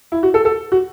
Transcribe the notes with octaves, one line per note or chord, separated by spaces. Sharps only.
E4
F#4
A4
A4
F#4